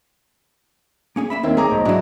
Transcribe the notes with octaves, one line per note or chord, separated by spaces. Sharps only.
A#3 C#4 G#4
A#3 E5 B5
D#2 A#3 C4 D#4 C#5 E5
A3 G#4 A#5 D6
B1 C5 D#5 A#5
G#2 F#3 D4 E4 F#4